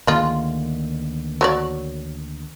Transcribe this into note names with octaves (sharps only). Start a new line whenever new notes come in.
D2 D#3 G#3 A#3 F4
F#3 C#5 D5